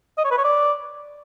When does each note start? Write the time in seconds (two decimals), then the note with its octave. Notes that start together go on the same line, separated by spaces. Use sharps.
0.18 D#5
0.24 C#5
0.31 B4
0.37 C#5
0.44 D5